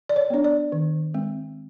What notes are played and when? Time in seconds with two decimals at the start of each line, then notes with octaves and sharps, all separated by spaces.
0.09 D5
0.16 C#5
0.30 B3 D4 C#5
0.44 D5
0.72 D#3
1.14 G#3 C4